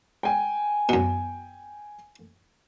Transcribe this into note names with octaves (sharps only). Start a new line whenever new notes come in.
G5 G#5
F#2 B2